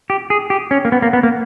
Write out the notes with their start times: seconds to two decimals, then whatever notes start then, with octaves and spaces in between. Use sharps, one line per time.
0.10 G4
0.30 G#4
0.50 G4
0.71 C#4
0.85 A#3
0.92 B3
1.02 A#3
1.13 B3
1.23 A#3